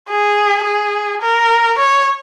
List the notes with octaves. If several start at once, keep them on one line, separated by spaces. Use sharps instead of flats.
G#4
G#4
A#4
C#5